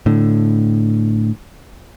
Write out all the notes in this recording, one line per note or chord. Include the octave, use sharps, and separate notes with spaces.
A2 D3